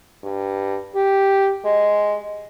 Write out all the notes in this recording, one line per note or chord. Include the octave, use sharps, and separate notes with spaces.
G2
G4
G#3